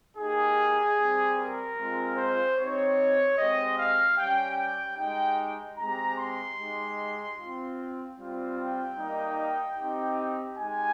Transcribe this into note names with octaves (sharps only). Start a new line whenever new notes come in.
A#3 D#4 G4 G#4
G3 C4 G4
A#4
G#3 C4 F4
C5
C4 D#4 G4 C#5
G#3 C4 G4 D#5
F5
G3 C#4 G4 G5
G5
G#3 D#4 G4 G5
G#3 C4 G4 A#5
C6
G#3 D#4 G4
C4 F4
G3 C4 F4
G5
G3 A#3 D#4
C4 D#4 G4
G#3 D#4 G4 G#5